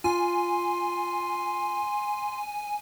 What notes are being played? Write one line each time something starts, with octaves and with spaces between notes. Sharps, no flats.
F4 G#5 C6